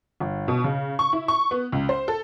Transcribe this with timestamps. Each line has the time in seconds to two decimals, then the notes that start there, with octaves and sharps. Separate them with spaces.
0.20 G1
0.48 B2
0.64 C#3
0.99 C#6
1.13 E4
1.28 C#6
1.51 B3
1.72 C#2
1.89 C5
2.08 A4